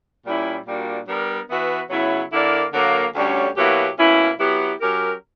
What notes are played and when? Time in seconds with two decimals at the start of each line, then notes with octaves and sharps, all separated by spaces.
0.25 A#2 G3 C#4 E4
0.66 A#2 G3 A#3 D4 F#4
1.07 G3 B3 D4 A#4
1.49 E3 B3 F#4 B4 E5
1.90 C#3 F#3 B3 E4
2.32 D3 A#3 E4 A#4 D5
2.73 D3 F#3 A#3
3.14 D2 D3 G3 C#4 G4
3.56 B2 F#3 A#3 E4 G4
3.97 B2 A#3 C#4 E4
4.39 F#3 B3 E4 G4
4.80 F#3 C#4 G4 A#4